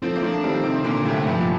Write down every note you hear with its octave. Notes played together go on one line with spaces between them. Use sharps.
F3 A3 C4
A#3
F3 A3 D4
D#3 G3 C4
C3 D#3
A#2 D3 A#3
A2 C3 A3
G2 A#2 F3